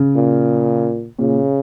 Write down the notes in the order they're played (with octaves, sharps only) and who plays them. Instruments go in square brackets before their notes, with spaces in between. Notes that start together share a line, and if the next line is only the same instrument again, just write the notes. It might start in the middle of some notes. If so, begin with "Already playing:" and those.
Already playing: [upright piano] C#3
[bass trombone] A#2
[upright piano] A#2 [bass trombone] C#3